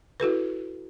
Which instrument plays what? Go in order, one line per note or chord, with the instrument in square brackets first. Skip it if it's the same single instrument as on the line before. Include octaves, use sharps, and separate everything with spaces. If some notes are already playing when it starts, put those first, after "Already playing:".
[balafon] E4 F#4 A4 B4